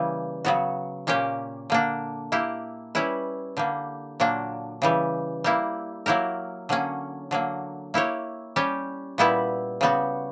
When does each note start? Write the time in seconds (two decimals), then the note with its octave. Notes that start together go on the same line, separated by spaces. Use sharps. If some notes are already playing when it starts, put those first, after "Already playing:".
Already playing: C#3 E3 G3 A#3
0.45 C#3 F#3 B3 F#4
1.07 A#2 A#3 C#4 G4
1.70 D3 A#3 D4
2.32 A#3 E4 G4
2.95 G3 C#4 E4 B4
3.57 D3 G3 A#3
4.20 A#2 F#3 A#3 D4
4.82 C#3 E3 G3
5.44 G3 A#3 E4
6.06 F#3 A#3 E4 G4 A#4
6.69 D3 F#3 A#3 C#4
7.31 D3 F#3 A#3
7.94 A#3 E4 G4 C#5
8.56 G3 C#4 G4
9.18 A#2 G3 B3 E4 B4
9.81 C#3 G3 B3 F#4